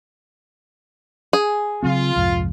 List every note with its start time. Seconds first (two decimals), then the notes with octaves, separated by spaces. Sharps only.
1.33 G#4
1.83 C#3 F#3 C4 F4
2.16 C2 F2 G#2